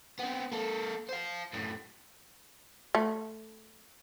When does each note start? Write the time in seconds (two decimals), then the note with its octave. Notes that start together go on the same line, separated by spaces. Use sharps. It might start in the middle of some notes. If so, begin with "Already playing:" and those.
0.19 B3 C4
0.52 A#3 A4
1.09 C5 F5
1.53 F#2 A2
2.95 A3